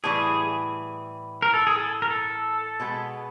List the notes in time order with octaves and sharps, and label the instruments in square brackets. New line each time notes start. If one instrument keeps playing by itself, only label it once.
[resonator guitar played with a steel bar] A2 E3 G3 [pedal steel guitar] G#4
[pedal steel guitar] A#4
A4
G#4
A4
A#4
A4
[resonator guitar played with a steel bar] B2 G#3 B3